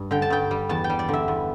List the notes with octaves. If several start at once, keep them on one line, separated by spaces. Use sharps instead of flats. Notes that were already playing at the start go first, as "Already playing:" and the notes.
Already playing: G2
D3 G5
A5
G2 G5
G3
E2 A5
G5
G3
D5
D3 E5
E2